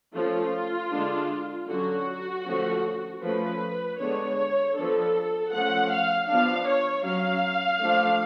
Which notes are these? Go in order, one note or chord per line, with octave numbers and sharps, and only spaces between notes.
F3 A3 C#4 F4
D3 G#3 D4
D3 F#3 C#4 F#4
D3 F3 A3 C#4
F3 A3 C#4 B4
D3 G#3 B3 D4 C#5
F3 B3 D4 A4
F3 A3 C#4 F#5
F5
F3 B3 D4 F5
C#5
F#3 C#4 F5
F3 A3 D4